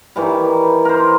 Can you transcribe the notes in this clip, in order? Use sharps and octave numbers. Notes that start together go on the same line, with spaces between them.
D#3 E3 G3
A#4 C5